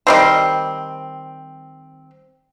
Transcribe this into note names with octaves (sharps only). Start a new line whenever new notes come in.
D#3 G3 C4